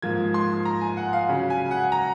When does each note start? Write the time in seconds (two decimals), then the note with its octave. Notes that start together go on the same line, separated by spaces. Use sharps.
0.02 G#2 F3 A#3 F4 G#6
0.34 C6
0.65 A#5
0.81 G#5
0.97 F#5
1.13 F5
1.29 C#3 F#3 C#4
1.50 G#5
1.71 F#5
1.92 A#5